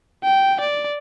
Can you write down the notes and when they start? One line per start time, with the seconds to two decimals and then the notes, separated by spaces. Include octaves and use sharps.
0.24 G5
0.61 D5